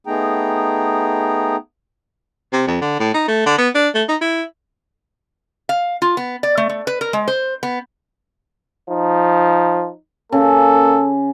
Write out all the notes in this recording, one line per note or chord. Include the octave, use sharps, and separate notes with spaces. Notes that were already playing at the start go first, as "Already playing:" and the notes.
A3 B3 D#4 G#4 G5 A#5
C3
F2
D3
A2
D#4
A3
D3
B3
D4
A3
D#4
E4
F5
F4
B3
D5
A3
A3
B4
A#4
G#3
C5
B3
F3 D#4
C#3 A#3 A4